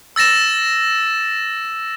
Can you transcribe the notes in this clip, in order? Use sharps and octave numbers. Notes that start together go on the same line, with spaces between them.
E6 A6 A#6 E7